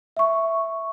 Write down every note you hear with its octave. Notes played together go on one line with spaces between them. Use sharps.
E5 C#6